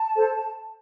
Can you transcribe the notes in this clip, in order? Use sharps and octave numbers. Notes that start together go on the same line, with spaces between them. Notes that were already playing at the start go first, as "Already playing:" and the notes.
Already playing: A5
A4 C5